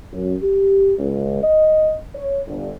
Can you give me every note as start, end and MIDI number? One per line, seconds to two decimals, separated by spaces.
0.13 0.33 42
0.42 0.93 67
0.98 1.42 37
1.42 1.94 75
2.15 2.39 73
2.47 2.70 31